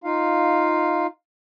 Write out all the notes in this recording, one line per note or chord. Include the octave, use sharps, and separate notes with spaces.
D#4 F4 F5